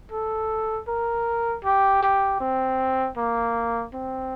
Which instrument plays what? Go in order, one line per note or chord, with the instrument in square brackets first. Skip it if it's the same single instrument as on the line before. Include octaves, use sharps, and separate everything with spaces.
[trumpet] A4
A#4
G4
G4
C4
A#3
C4